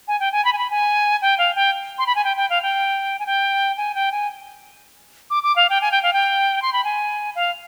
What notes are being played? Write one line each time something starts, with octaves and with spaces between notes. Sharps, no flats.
G#5
G5
G#5
B5
G#5
B5
G#5
G5
F5
G5
C6
B5
G#5
G5
G5
F5
G5
G#5
G5
G#5
G5
G#5
D6
D6
F5
G5
G#5
G5
F5
G5
C6
B5
G#5
F5